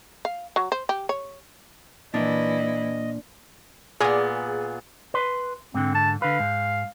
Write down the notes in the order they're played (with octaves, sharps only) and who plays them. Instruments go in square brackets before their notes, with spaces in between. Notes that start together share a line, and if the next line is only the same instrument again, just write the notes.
[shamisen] F5
F#3
C5
G4
C#5
[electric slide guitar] A#2 [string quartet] E3 E4 [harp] D4 [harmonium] D#5
[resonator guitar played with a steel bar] A#2 B3 [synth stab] G#4
[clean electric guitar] B4 C6
[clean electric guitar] G#2 D3 [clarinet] C4
[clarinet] A5
[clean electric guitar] D3 B4 [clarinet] F5
[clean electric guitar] G#2